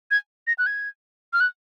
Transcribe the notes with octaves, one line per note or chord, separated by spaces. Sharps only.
G#6
A#6
F#6
G#6
F6
F#6